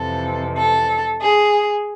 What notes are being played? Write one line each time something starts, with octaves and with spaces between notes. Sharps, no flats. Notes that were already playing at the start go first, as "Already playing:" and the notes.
Already playing: F2 C3 E3 A4
A4
G#4